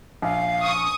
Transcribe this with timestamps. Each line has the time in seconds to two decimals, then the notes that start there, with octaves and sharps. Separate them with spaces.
0.22 A#1 F5
0.62 C#6 D#6